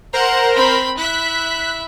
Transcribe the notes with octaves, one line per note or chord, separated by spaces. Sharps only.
A#4 C5 F#5 A#5
C4 B5
E4 E5 F#6 B6